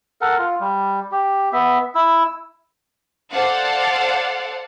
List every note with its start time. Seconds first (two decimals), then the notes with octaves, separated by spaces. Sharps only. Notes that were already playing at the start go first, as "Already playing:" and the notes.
0.21 A4 A#4 F#5
0.38 F4
0.60 G3
1.12 G4
1.53 B3 E5
1.95 E4 E6
3.32 A4 C5 D5 F5 F#5